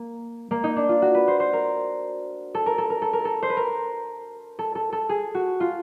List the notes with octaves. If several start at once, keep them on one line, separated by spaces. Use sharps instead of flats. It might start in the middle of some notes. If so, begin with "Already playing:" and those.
Already playing: A#3
A#3
D#4
D4
F4
F#4
B4
C5
C5
A#4
A4
A#4
A4
A#4
A4
A#4
A4
C5
B4
A#4
A4
A4
A4
G#4
F#4
F4